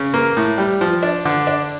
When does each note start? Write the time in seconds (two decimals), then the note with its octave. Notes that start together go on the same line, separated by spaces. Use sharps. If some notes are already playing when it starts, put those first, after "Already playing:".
Already playing: C#3
0.14 A#3
0.37 A2
0.58 G3
0.81 F3
1.03 D4
1.25 D3
1.47 D4